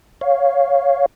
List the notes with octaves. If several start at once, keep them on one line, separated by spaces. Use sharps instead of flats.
C#5 F5